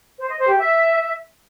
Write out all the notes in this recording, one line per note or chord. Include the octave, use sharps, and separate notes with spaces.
C5
D#5
C5
G4
E5